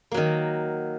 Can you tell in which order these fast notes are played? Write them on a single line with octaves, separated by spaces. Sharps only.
A#3 F#3 D#3